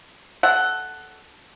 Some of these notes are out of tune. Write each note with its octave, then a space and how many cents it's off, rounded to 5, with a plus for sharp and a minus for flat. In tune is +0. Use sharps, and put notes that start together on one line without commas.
A4 -5 F#5 +10